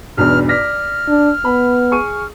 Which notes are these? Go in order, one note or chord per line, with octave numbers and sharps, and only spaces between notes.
B1 E2 G2 F6
D5 F6 A#6 B6
D4
B3 B5
G#4 C#6 D#7